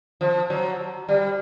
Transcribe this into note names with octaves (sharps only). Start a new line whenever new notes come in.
F3
F#3
G3